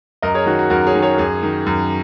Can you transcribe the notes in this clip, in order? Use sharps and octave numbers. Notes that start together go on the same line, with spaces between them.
F#2 A#4 D#5
G#4 C#5
D#3 F#4
F#4
F#2 F#4 A#4
G#4 C#5
D#3
G#4 C#5
F#2 G#4
D#3
F#2